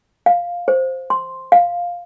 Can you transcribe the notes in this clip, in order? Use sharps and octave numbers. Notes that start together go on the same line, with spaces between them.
F5
C5
C6
F5